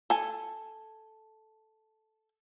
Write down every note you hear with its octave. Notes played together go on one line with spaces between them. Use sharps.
A4 G#5